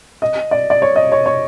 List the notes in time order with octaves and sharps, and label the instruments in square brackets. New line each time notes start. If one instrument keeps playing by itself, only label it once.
[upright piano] D#5
D5
D5
C#5
D#5
C#5
C#5